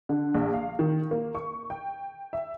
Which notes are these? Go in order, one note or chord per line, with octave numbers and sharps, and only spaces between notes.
D3
A#1
F5
D#3
A#3
C#6
G5
E5